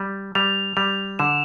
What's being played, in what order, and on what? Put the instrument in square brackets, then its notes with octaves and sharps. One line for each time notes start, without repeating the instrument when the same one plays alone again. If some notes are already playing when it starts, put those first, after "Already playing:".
Already playing: [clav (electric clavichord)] G3
[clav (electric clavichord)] G3 [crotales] F7
[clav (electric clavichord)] G3 [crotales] F7
[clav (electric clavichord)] D3 [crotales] E7